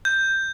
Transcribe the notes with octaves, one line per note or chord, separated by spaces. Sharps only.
G6